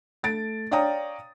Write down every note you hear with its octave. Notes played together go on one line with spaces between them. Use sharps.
A3 A6 D7
C#5 D5 F5 G5 A#5 D#6